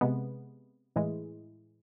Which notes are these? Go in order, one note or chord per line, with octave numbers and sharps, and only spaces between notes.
C3 G#3 B3
A2 E3 G#3